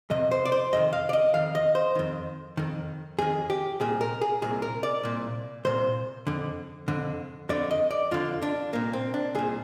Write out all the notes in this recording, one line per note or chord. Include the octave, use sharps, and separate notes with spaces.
F2 C3 D#5
C5
D5
C5
F2 C3 D#3 D#5
F5
D5
D#5
F2 D#3 F5
D#5
C5
F2 D#3
F2 D#3
F2 D#3 G#4
G4
C2 A#2 G#4
A#4
G#4
C2 A#2 G#4
A#4
D5
C2 A#2
C2 A#2 C5
F2 D3
F2 D3
F2 D3 D5
D#5
D5
F2 D3 F4
D4
C2 A#2 A#3
C4
D4
C2 A#2 G#4